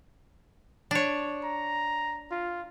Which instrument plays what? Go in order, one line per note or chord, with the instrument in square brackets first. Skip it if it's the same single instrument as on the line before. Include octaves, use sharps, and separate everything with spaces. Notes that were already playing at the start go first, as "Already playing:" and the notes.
[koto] D4 C#5
[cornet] A#5
F4